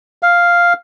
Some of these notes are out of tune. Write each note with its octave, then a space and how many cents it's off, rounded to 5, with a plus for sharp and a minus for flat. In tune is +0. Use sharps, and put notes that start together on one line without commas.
F5 +0